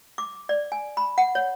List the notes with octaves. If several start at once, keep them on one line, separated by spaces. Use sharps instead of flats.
D6
D5
G#5
B5
F#5
C#5